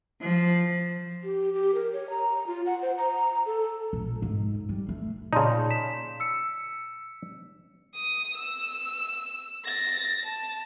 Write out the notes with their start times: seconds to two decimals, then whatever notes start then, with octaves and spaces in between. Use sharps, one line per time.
0.21 F3
1.24 G4
1.54 G4
1.75 A#4
1.93 C#5
2.10 A#5
2.47 F4
2.66 F#5
2.82 C5
2.98 A#5
3.46 A4
3.93 A#1
4.22 G#2
4.69 G3
4.89 A3
5.33 A#2 C#3 D#4 D5 A5 C6
5.71 B6 E7
6.20 E6 C#7
7.95 D#6
8.37 E6
9.64 A6 A#6
10.24 A5